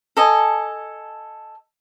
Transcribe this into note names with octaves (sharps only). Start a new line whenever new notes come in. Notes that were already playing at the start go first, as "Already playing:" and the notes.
A4 D#5 G#5